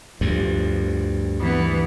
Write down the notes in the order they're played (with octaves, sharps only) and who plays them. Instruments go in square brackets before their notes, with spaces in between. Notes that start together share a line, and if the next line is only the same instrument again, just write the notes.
[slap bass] D2 G2 [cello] F3
[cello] E3 B3